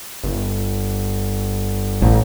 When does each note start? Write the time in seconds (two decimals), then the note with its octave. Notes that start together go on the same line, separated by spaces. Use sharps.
0.24 G1
2.02 A1